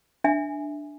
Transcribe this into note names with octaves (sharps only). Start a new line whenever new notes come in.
D4 E5 G#5